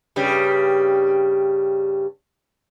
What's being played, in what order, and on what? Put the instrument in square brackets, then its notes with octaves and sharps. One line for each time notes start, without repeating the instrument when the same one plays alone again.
[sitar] G2 C#3 G3